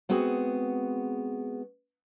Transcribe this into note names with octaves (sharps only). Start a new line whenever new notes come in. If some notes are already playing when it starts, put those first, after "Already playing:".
G#3 B3 C4 F#4 G#4